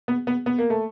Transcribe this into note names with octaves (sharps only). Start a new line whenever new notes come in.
B3
B3
B3
A#3
A3